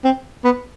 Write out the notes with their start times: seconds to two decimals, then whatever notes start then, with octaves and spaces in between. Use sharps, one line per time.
0.05 C4
0.44 B3